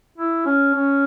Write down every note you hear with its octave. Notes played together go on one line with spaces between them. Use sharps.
E4
C#4
C#4